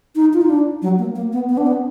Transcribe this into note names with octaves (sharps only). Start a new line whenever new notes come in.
D#4
F4
D#4
D4
F#3
A#3
A#3
B3
B3
D4
B3